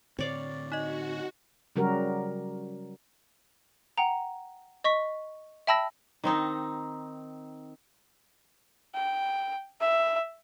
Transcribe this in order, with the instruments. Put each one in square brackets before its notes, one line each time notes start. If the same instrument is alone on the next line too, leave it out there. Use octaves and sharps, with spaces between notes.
[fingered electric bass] A2 D3 C4 [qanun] C#5 D5 F5
[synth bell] D#4 D#5 [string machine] F#4
[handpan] C#3 F#3 G3 F#4 G4 A#4
[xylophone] F#5 G5 A#5
D#5 C#6 B6
E5 G5 A5 B5 E6 A#6
[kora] D#3 C4 D#4
[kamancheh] G5
E5